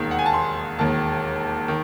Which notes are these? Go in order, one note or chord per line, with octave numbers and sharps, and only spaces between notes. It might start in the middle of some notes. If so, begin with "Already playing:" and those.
Already playing: E1 D#2 D#3
F#5
G#5
A5
C6
E1 D#2 D#3 A5
D#3